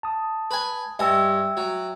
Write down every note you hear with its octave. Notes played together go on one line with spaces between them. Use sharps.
A5 D#6
B4 G#5
G2 D#5 E5 G5 G#5 E6
F#3